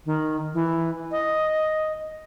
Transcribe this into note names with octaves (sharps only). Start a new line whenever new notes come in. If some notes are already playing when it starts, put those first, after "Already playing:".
D#3
E3
D#5